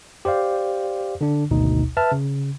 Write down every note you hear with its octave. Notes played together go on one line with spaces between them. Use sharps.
G4 C5 D5 F5
D3 D4
G#1 D2 B2 D#4
B4 E5 A5 F6
C#3